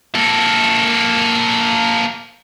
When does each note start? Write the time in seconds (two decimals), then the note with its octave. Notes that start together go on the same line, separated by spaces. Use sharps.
0.15 A#3 A4